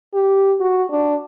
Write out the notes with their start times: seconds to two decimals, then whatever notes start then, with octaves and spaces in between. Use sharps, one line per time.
0.14 G4
0.60 F#4
0.90 D4